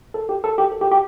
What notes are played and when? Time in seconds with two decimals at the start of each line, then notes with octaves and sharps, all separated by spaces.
0.14 A4
0.29 G4
0.44 A4
0.58 G4
0.72 A4
0.81 G4
0.92 G4